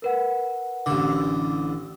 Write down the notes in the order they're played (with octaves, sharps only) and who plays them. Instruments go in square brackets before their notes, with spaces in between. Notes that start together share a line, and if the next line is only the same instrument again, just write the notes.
[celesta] A#4 B4 F#5
[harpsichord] A1 D3 [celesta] D6